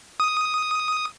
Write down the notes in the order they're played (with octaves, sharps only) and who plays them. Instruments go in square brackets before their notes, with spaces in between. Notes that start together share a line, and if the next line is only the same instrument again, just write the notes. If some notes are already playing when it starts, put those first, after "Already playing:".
[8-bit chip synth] D#6